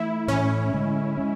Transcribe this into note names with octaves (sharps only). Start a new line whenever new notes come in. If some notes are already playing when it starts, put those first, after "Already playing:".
Already playing: E3 A3 E4
A2 E3 A3 C#4
D3 G#3 C#4
G#3 C#4